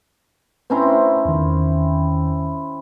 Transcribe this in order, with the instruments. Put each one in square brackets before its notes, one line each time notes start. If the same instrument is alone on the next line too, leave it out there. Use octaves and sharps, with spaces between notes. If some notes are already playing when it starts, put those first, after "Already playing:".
[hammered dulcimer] C4 C#4 E4 [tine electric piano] B4 A#5 C6
[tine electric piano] E2 D#3